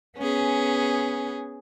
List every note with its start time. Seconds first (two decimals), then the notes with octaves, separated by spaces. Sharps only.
0.18 B3 C#4 G#4